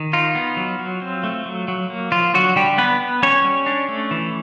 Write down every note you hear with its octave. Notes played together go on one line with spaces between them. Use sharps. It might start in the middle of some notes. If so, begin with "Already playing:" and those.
Already playing: D#3
D#4 F4
B3
F#3
F#3
C4
A3
F#3
F#3
A#3
F3 F4
D3 F#3 F#4
D3 G3 G4
B3 D4 B4
B3
G3 C#4 C#5
G3
D4
A3
E3